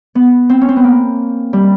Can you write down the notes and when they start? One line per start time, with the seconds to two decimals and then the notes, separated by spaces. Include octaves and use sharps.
0.15 B3
0.49 C4
0.61 C#4
0.69 C4
0.76 B3
0.84 A#3
1.53 G3